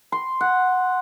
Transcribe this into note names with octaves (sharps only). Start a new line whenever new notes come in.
C6
F#5